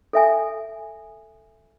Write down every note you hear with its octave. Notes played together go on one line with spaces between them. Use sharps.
A4 E5 G#5